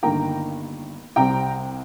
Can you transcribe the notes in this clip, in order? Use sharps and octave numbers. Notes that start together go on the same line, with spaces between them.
G1 G2 D#3 A#3 G5 A#5
C2 C3 G3 C4 G5 A#5